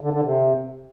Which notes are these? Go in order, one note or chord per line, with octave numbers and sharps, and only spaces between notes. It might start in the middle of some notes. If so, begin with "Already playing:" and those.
D3
D3
C3